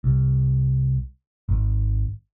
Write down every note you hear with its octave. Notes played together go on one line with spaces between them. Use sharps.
C2
G#1